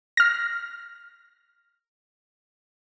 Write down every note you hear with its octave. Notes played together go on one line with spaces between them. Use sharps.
F6 A#6